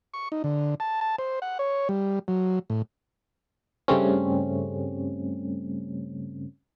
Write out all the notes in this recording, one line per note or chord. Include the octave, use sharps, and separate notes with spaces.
C#6
D#4
D3
A5
A5
C5
F#5
C#5
G3
F#3
A2
G2 C#3 G3 A3 C4 C#4